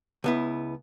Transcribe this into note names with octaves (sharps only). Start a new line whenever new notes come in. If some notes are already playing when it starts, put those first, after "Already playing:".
C#2 B3 E4